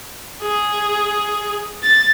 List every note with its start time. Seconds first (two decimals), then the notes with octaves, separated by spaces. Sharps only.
0.42 G#4
1.83 A6